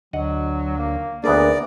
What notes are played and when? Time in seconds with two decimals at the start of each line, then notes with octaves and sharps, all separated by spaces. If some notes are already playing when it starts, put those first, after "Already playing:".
0.13 D2 F#3 D#5 F#5
0.77 A#3
1.24 D2 A#3 B3 D4 G#4 A#4 D5